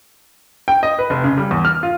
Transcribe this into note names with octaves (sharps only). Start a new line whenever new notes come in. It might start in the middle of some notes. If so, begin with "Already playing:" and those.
G5
D#5
B4
F1
C#3
G3
E2
F6
F4